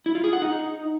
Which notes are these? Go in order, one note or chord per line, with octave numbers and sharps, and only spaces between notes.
E4
F4
G#4
F#5
D#4